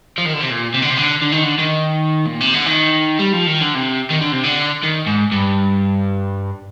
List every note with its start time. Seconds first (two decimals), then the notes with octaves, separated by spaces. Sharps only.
0.18 F3
0.26 D#3
0.34 D3
0.42 C3
0.50 A#2
0.74 C3
0.82 D3
0.90 C3
0.98 D3
1.22 D3
1.32 D#3
1.44 D3
1.59 D#3
2.26 A#2
2.41 C3
2.54 D3
2.66 D#3
3.19 G3
3.33 F3
3.47 D#3
3.61 D3
3.75 C3
4.10 D#3
4.21 D3
4.32 C3
4.44 D3
4.83 D#3
5.06 G#2
5.32 G2